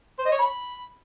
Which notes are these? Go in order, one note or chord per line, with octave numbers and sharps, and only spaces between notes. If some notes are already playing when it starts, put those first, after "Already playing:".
C5
D#5
C#5
B5